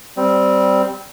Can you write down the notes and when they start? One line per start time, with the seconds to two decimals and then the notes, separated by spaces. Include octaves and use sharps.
0.17 G3 C4